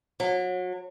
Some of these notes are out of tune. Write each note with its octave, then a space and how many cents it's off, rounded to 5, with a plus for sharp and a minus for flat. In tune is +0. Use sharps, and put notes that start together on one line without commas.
F#3 -30